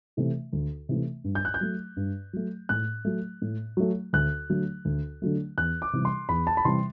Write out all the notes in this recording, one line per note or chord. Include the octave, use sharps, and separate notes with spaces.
C3 E3 A3
D2
C3 E3 A3
G2
G6
F#6
G6
F#3 A3
G2
F#3 A3
A2 F#6
F#3 A3
A2
F#3 A3
D2 F#6
D3 F#3 A3
D2
D3 F#3 A3
E2 F#6
D6
C3 E3 G3
C6
E2 B5
A5
B5
C3 E3 G3 C6